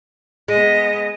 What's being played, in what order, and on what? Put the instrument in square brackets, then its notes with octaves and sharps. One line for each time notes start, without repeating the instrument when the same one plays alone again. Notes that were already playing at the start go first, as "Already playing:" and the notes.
[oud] G#3 [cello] B3 D#5